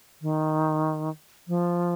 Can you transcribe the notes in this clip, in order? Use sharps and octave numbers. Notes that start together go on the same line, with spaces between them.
D#3
F3